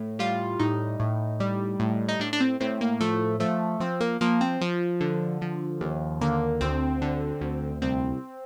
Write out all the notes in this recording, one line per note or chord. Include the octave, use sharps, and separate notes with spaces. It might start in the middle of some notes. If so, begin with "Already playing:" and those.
Already playing: A2
G3 F4
A2 D#4
A2
G3
A2
D#4
A2 D4
D4
C4
A2 C4
A#3
F3 A3
F3 A3
F3 C4
A#3
F3 A#3
C4
F3
D3
F3
D#2
D3 A#3
D2 C4
D3
D2
C2 C4